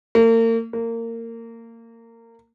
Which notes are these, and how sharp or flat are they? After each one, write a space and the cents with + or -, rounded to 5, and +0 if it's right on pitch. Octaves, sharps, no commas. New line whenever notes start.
A#3 -40
A#3 -25